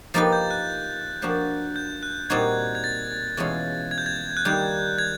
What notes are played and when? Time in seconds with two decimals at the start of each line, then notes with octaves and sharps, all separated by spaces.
0.14 F3 A#3 D#4 G4 B4 A6
0.33 G6
0.51 F#6
1.22 F3 A#3 D4 F#4
1.76 G6
2.03 F#6
2.30 A#2 G3 C4 D#4 F#4 G#6
2.75 G#6
2.84 A6
3.37 E2 B2 G#3 C#4 F4
3.91 G#6
3.98 G6
4.06 G#6
4.37 F#6
4.45 D#3 G3 A#3 G6
4.99 G#6